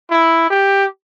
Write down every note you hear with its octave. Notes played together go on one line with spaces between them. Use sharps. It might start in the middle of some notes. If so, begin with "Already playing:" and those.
E4
G4